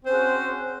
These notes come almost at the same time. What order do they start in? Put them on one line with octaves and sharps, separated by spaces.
C5 C4 C#4 G#4 F#4